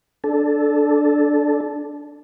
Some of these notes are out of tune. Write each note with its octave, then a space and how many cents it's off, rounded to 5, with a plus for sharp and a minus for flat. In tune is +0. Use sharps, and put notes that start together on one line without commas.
D4 +0 A4 -10